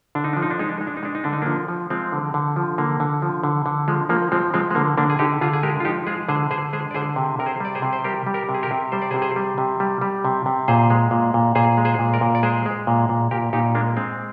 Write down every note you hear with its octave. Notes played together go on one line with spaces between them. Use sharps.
D3 D4
D#4
F3 D4
D#4
D4
G#3 D#4
D4
G#3 D#4
D4
D#4
G#3 D4
D#4
D3 D4
D#4
F3 A#3 D4
F3
F3 G#3 C4
D3
D3
F3
D3 A#3
D3
F3
D3
D3
F3 G#3
F3 A#3
F3 G#3 C4
F3 G#3 C4
G#3
D3 A#3
D3 A#3 D4
G#4
D3 D#4 G4
D3 F4 G#4
G#4
G#3 G4 A#4
F4
F3 D#4 G4
G#3 F4 G#4
D3 G#4 C5
D3 G#4 C5
G#3 G#4 C5
D5
D3 G#4 C5
C3
C3 A#4
G#4 C5
G3 D5
G#4 C5
C3
C5
G3 G4 A#4
G3
G4 A#4
C3
G#4
G4 A#4
C3
G3 C5
D5
G#4 C5
C3
G#4 C5
G3
C3
G3
G3
C3
C3
A#2 G#4 C5
G#3
A#2
A#2
A#2 G#4 C5
G#3
G#4 C5
A#2
A#4 D5
A#2
D5
G#3 G#4 C5
G#3
A#2
A#2
A#2 G4 A#4
A#2 D#4 G4
G#3 A#3 D4
G#3 C4